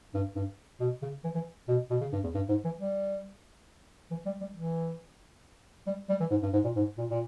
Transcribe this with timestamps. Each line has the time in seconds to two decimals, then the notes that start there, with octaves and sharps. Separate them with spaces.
0.14 G2
0.36 G2
0.80 B2
1.02 C#3
1.24 E3
1.35 E3
1.68 B2
1.91 B2
2.01 C#3
2.13 G2
2.24 E2
2.35 G2
2.49 G#2
2.65 E3
2.79 G3
4.11 E3
4.26 G3
4.41 G3
4.56 E3
5.87 G3
6.10 G3
6.21 E3
6.31 G#2
6.43 G2
6.53 G#2
6.65 A#2
6.76 G#2
6.98 A#2
7.11 A#2